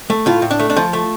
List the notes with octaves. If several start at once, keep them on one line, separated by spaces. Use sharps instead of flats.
A3
A2 F4
A2
D4
A3
D4
F3 F4
A3